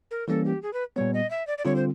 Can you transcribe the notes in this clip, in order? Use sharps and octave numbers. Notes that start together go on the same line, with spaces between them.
A#4
E3 G3 A#3 C#4 A4
G4
G#4
B4
A#2 G3 B3 C#5
D#5
E5
D5
D5
D3 G3 C4 F4 C#5
C5